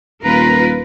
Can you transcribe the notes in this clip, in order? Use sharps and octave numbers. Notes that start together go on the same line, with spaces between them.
D#1 F4 A#4 B4 A#5